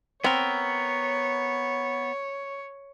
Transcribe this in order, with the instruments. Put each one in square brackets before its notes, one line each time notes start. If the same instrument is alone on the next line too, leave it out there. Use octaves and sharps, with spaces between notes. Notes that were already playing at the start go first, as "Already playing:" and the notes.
[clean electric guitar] B3 A#4 [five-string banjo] C4 [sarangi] C#5